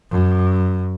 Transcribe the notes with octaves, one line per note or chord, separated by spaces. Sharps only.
F#2